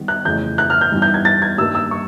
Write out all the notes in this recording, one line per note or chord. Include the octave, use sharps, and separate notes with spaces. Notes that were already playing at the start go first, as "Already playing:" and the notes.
Already playing: D#3 G3 B3
F#6
F2 C#3 E3 A3 G6
F#6
F6
G6
G2 E3 G3 B3 D#4
G6
G#6
A6
G#6
G2 D#3 G3 A#3 E6
E6
C#6